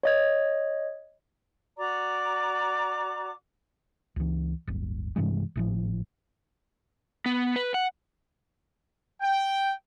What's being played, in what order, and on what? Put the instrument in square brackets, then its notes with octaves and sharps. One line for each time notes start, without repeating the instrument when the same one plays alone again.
[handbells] C#5 D#5 G#6
[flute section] F#4 D5 A#5 D6
[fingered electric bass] C#2 E3
D1 G1
G2 C3 E3 G#3
G#1 A2 F3
[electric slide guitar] B3
B4
F#5
[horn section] G5